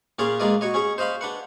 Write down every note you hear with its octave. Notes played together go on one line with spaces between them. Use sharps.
A#2 C#4 G#4 D5 F5 C6
G#3 A#3 F4 B4 D5 D#5
F#4 C#5 D#5
C#4 G#4 C#5
C5 D#5 F5 B5 C6
D4 B4 F#5